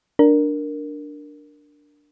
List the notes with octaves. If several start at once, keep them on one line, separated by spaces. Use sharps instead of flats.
D4 A#4